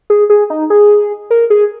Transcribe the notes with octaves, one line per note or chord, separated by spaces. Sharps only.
G#4
G#4
D#4
G#4
A#4
G#4